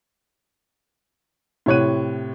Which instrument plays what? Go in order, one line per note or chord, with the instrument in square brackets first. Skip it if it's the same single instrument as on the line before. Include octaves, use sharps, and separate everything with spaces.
[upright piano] A2 C3 C#5 F#6 D#7